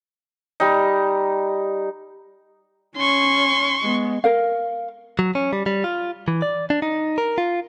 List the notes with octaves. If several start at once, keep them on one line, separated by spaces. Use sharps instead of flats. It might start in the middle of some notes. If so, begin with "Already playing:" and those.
G3 D#4
C#4 C6 C#6
G#3 B3
A#4 F5
F#3
C#4
G3
G3
F4
E3
D5
D4
D#4
A#4
F4